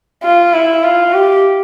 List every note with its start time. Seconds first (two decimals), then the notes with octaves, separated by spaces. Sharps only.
0.23 F4
0.53 E4
0.83 F4
1.13 G4